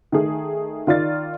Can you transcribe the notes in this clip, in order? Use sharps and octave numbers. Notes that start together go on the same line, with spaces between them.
D#3 A3 G#4
D#3 F4 D5 A6